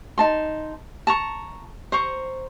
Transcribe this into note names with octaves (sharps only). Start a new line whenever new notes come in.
D#4 A5 C6
A5 A#5 C#6
C5 A#5 C#6